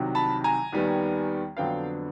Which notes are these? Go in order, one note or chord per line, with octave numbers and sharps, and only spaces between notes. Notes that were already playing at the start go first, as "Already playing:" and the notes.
Already playing: C2 C3 D#3 F#3
A5 B5
G#5 A#5
D#2 D#3 G3 B3
F2 D3 F#3 B3 F5 G5